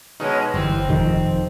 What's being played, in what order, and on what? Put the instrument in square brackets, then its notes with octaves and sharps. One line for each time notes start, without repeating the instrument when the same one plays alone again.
[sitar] B2 G#3 C#4 [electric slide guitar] D#4
[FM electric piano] G1 [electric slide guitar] E3 G3 [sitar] C4
[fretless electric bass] F1 C3 D#3 [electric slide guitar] F2 F3